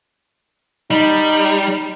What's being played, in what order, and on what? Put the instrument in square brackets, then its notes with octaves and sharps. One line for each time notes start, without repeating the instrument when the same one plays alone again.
[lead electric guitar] G3 [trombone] D#4